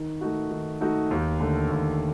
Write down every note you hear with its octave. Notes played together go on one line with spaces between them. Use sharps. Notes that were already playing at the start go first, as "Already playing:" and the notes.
Already playing: D#3
A3 D#4 F#4
D#3
A3 D#4 F#4
D#2
D3 A3
D#2